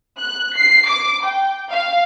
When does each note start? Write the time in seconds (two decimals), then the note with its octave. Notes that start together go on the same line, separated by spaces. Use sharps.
0.19 F#6
0.56 C7
0.88 D6
1.26 G5
1.72 F5